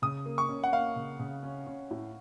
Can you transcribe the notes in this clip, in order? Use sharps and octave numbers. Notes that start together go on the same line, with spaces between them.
C#3 D#6
A#3
C#6
C#4
F#5
A#3 F5
C#3
C#3
C#4
C#4
A2